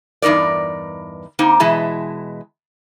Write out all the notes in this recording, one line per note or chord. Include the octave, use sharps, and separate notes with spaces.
E2 G2 D#4 A#4 D5
A#3 C4 D#4
B2 E3 G#3 E4 A5